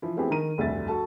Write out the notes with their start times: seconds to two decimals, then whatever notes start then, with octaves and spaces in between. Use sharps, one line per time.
0.02 E3 F3 E4
0.17 A3 B3 C4 E4 G4 G#4
0.30 D#3 A#4 A#5 D#7
0.58 F1 D2 G2 D3 E5 A6
0.88 F#4 A4 A5